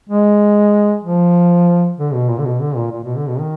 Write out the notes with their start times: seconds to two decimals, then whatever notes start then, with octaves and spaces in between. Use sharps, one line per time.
0.09 G#3
1.03 F3
1.98 D3
2.13 B2
2.29 A#2
2.39 D3
2.45 B2
2.61 D3
2.76 A#2
2.92 A#2
3.04 B2
3.16 D3
3.28 B2
3.40 D#3